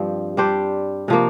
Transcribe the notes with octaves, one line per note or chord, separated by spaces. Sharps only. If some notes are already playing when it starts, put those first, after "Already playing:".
Already playing: G2 F3 C4
G3 D4 G4 C5
C3 F3 A#3